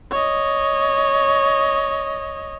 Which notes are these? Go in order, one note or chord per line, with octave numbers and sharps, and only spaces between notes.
C#5 D#5